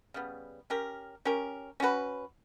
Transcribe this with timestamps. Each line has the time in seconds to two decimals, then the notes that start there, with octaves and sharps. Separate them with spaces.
0.14 C#3 G3 B3
0.70 C#4 G4 A#4
1.25 C#4 G4 A#4
1.80 C#4 F#4 B4